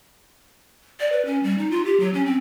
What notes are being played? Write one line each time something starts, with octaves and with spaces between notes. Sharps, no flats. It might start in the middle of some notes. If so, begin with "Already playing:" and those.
D5
B4
C#4
G3
D#4
F4
G4
F#3
C#4
C4